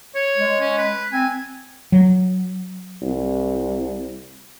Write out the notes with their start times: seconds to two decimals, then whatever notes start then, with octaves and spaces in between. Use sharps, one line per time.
0.15 C#5
0.37 G#3
0.60 C#4
0.78 B4
1.13 C4 G#5
1.92 F#3
3.02 C2